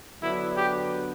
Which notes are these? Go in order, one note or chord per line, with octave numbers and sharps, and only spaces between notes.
D3 F#3 B3 D4 E4
G4